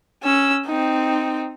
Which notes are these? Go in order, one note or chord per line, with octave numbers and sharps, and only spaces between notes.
C#4 E6
C4 D#4